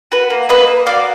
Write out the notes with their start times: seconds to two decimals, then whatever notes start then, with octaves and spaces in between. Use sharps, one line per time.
0.12 F#4 B4
0.30 A#3
0.49 A#3 B4 D#5
0.67 A#3
0.86 F#4 D5 F5